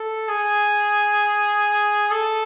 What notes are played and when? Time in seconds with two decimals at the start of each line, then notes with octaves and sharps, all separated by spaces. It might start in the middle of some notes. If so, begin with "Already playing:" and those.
Already playing: A4
0.29 G#4
2.11 A4